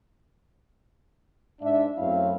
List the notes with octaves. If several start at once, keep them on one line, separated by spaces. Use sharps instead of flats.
G#2 D4 E5
F#2 A3 C4 E4 C#5 F5